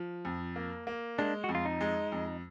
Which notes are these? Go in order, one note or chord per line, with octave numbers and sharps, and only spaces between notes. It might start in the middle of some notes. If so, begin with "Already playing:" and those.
Already playing: F3
F2
A#3
A#3
G#3 D4
F2 F#4
F4
D#4
G#3
F2